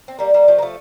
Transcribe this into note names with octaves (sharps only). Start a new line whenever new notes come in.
C4
G3 A#3
G3 A#3
F3 A3
A#3
F3 A3